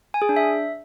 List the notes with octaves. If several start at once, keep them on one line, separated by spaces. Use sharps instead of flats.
G#5
G#4
D4
E5